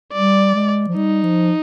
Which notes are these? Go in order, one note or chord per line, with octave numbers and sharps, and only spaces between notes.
G3 D5
G#3
F3
G3 D#4
F3